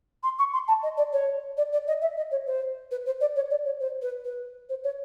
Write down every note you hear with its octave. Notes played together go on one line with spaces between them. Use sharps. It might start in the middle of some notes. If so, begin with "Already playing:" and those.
C6
C#6
C6
A5
D#5
D5
C#5
D5
D5
D#5
E5
D#5
C#5
C5
B4
C5
D5
C#5
D5
C#5
C5
B4
B4
C5
C#5